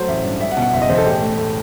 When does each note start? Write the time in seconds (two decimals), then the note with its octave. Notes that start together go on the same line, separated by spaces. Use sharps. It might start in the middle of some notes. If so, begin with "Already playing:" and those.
Already playing: F#3 A3 C5
0.08 A1 E5
0.24 G2
0.40 G3 E5
0.51 F#5
0.57 B2
0.62 F#5
0.73 F#1 E5
0.82 D#5
0.89 E2 C5
0.98 A4
1.05 A2 G4
1.22 A3
1.38 A2